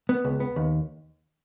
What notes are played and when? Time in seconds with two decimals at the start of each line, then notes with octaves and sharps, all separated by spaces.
0.09 B3
0.25 C#2
0.40 B3
0.56 D#2